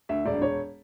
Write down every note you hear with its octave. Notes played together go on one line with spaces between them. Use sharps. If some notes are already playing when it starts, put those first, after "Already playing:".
D2 E5
E1 D5
E1 C#5